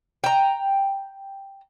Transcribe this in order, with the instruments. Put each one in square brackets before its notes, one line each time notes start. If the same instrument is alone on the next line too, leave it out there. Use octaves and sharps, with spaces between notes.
[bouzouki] G5 A#5